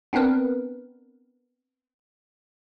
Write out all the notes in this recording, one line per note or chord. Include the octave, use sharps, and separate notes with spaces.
B3 C4 D4 A#4 B4